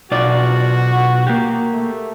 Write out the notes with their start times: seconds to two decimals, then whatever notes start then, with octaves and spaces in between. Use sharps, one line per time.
0.11 B1 F4 F#4 D5
1.27 A#3 G4
1.72 A3